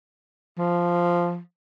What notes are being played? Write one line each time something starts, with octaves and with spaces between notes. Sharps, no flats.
F3